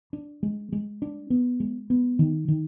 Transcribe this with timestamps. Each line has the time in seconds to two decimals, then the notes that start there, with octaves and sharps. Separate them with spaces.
0.13 D4
0.43 G#3
0.72 G#3
1.02 D4
1.30 B3
1.60 G#3
1.90 B3
2.19 D#3
2.48 D#3